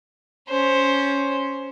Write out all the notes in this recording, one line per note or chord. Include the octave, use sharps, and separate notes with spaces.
C#4 C5